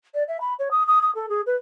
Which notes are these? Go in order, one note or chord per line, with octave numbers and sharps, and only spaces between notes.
D5
E5
B5
C#5
D#6
D#6
D#6
A4
G#4
B4